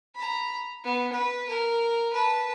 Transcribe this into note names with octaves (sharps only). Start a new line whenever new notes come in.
A#5 B5
B3
B4
A#4
B4 A5